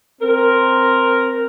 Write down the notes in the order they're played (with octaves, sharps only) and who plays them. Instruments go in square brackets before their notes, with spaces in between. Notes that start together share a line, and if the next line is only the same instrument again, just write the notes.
[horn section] C4 A#4